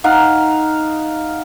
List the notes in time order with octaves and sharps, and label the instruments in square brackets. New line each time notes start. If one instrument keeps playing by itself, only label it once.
[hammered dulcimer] D#4 F5 F#5